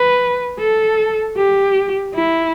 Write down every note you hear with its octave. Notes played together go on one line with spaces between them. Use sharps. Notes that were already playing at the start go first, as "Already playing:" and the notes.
Already playing: B4
A4
G4
E4